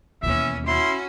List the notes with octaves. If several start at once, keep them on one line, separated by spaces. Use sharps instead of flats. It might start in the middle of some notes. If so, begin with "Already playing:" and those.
D#2 B2 E3 C#4 E5
C#4 E4 F#4 C6